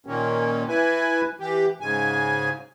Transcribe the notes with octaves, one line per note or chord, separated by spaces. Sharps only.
A#2 D#3 A#3 C#4
E3 E4 B4 G#5
E3 G4
G#2 C#3 G#5